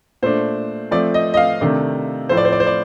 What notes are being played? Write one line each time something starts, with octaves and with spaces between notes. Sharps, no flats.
A#2 A3 D4 C5
F3 A3 C4 D5
D#5
D#5
F5
C3 D#3 A3 D4
A2 F3 A3 C5
D5
C5
D5
C5
D5